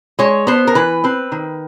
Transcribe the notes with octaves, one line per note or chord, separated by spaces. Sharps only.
G#3 C#5
B3 C5
A#4
E3 B4
C4 B4
D#3